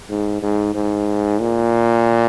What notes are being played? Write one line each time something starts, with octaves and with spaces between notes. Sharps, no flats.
G#2
G#2
G#2
A#2